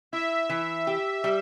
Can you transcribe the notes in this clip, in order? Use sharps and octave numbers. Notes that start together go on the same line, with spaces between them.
E4 E5
E3
G4
G3